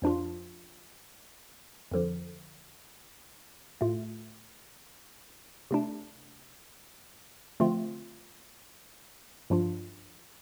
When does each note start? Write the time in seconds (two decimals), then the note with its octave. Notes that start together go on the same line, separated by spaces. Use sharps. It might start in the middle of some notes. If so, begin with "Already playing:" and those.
0.02 F2 F3 D4 F4
1.91 F2 D3 F3
3.81 A2 A3 F4
5.71 C3 A3 D4
7.60 D3 F3 A3 C4 F4
9.50 G2 F3 D4 F4